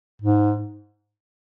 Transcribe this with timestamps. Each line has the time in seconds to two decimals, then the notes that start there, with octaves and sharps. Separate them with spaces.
0.22 G#2